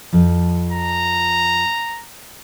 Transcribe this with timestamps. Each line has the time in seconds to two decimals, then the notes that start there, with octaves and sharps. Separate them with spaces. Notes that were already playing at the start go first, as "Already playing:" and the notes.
0.13 F2 F3
0.72 A#5